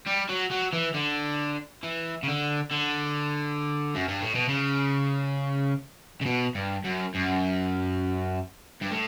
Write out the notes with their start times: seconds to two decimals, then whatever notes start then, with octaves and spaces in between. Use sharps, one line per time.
0.06 G3
0.29 F#3
0.51 F#3
0.73 E3
0.94 D3
1.83 E3
2.23 C#3
2.28 D3
2.71 D3
3.95 F#2
4.08 G2
4.22 A2
4.35 B2
4.49 C#3
6.21 C#3
6.26 B2
6.55 G2
6.84 F#2
7.14 F#2
8.81 G2
8.91 A2